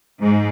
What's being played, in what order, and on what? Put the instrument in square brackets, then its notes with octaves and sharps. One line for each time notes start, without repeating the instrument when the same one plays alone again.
[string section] G#2